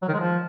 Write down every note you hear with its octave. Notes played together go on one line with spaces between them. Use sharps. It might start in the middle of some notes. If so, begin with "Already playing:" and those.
F#3
D#3
G#3
F3